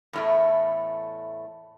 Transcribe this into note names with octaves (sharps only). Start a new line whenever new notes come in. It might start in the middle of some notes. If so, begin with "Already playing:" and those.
E2 A2 A3